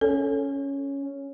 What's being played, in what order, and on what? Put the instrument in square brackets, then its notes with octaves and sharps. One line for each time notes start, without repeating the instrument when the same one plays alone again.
[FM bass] C#4 [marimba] A4